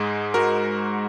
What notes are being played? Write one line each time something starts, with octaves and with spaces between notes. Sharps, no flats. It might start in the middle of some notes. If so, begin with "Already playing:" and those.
Already playing: G#2 G#3 G#4
F#4 A#4